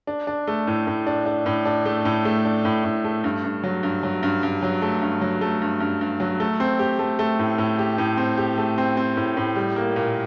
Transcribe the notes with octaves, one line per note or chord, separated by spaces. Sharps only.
D4
D4
A3
A2
A2
D4
D4
A2
D4
A3
A2
A3
D4
A2
A2
A3
G2
G2
F#3
G2
F#3
G2
G2
F#3
A3
G2
F#3
A3
G2
G2
G2
F#3
A3
C4
G4
A3
A3
A2
A2
G4
A2
C4
G4
A3
C4
C4
A2
A2
G3
A#3
A#2